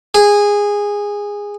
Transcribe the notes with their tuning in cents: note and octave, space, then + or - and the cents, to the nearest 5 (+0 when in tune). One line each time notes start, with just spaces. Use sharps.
G#4 -15